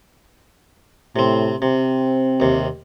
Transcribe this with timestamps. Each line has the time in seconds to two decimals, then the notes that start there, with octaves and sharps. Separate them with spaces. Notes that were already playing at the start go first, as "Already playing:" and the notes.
1.16 A2 C3 C4
1.62 C3 C4
2.40 D#2 C3